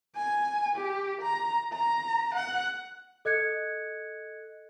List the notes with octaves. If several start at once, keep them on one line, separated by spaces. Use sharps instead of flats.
G#5
G4
A#5
A#5
F#5
A4 D#5 F#6 G#6 C#7